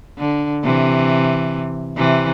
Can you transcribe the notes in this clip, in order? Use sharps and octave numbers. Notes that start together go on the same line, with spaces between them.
D3
C3 E3
C3 E3